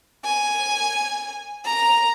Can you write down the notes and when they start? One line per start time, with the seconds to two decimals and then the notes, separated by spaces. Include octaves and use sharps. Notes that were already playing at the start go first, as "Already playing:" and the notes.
0.25 G#5
1.65 A#5